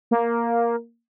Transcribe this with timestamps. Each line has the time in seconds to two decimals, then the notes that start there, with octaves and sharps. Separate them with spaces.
0.11 A#3